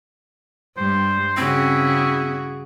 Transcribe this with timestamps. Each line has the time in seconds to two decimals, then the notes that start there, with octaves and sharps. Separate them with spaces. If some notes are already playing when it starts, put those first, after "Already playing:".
0.77 G2 G3 C5
1.37 C#3 C4 E4 F#4 G#4